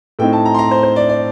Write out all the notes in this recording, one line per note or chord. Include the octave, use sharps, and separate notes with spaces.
A2 A3 C4 D#4 G5
A5
A#5
C6
A#5
C5
C5
D5
D5